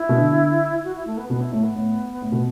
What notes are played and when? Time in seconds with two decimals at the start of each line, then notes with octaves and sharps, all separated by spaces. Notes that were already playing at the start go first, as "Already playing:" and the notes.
Already playing: E4
0.09 B2
0.15 D3
0.84 F#4
0.95 E4
1.07 A3
1.17 B3
1.29 B2 B3
1.41 E4
1.52 A2 A3
1.63 B3
1.75 A2
2.21 A2
2.32 B2